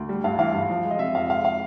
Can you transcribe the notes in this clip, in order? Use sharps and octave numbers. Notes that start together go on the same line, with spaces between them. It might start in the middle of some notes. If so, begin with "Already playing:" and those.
Already playing: D2
G3
G2 F5
E3 F5
G2
F3
G#3
D#5
C3 E5
F2 F5
G#3 F5
F5